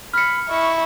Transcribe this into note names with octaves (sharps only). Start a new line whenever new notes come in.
B5 F6 C#7
E4 D#5 C#6